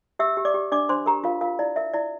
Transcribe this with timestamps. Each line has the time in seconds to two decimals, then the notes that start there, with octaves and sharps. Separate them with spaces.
0.19 G4 E5 E6
0.37 G4
0.45 D5 D6
0.54 G4
0.72 D4 D5 D6
0.89 D4 C5 C6
1.06 G4 A#4 A#5
1.24 F4 A#4 F5
1.41 F4 A#4 F5
1.59 E4 D5
1.76 A#4 E5
1.93 E4 D5